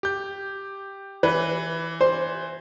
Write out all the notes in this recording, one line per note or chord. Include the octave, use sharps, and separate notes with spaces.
G4 G6
E3 B4
C5